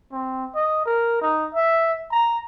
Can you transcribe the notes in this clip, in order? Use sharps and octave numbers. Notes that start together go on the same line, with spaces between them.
C4
D#5
A#4
D#4
E5
A#5